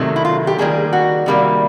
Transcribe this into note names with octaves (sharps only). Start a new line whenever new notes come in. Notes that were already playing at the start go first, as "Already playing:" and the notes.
Already playing: C3 D#3 F#3 A3
E4
F4
G4
D#3 G3 A#3 G#4
F#4
C3 D#3 G3 A#3